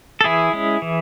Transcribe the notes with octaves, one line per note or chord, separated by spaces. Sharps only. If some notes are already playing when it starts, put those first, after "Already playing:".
A4
E3 E4 G#4
G#3 C#4
E3